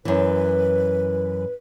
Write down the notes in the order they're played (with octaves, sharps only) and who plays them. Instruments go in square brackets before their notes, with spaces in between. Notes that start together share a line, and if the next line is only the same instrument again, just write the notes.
[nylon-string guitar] F#2 E3 [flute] B4